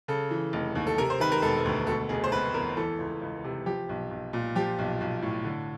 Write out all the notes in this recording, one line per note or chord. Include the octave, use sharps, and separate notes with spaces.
C#3 A4
E3
F1
D#2
A4
C3 A#4
C5
D#3 B4
A#4
E1 A4
D2
B2 A4
F1 G#4
C5
F1 B4
E2 A#4
E3 A4
C#2
C#2
C3
F3 G4
B1
B1
A#2
F3 G4
B1
B1
A2
D3